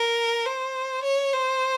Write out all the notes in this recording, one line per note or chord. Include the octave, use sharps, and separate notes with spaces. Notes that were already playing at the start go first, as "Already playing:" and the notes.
Already playing: A#4
C5
C#5
C5